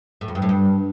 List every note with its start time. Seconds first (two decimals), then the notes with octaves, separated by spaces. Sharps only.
0.21 A2
0.28 F2
0.35 G2
0.42 A2
0.49 G2